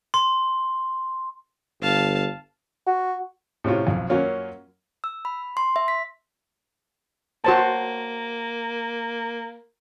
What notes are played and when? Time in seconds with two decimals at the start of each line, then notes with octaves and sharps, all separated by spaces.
0.14 C6
1.82 G1 F5 A5
2.87 F#4
3.64 A2 C3 C#4 F4
3.87 B1 F2
4.10 F#2 F#3 A#3 C#4 F4
5.04 E6
5.25 B5
5.57 C6
5.76 E5
5.88 B6
7.44 A#3 F#4 C5 A5